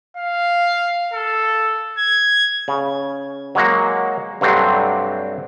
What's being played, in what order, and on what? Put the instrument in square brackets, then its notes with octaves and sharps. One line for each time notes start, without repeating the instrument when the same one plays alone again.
[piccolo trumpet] F5
A4
G#6
[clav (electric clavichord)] C#3
F#3 G#3 A#3 F#4
G2 C3 F#3 A3 C4 D4